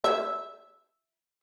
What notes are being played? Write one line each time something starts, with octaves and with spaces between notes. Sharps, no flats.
E5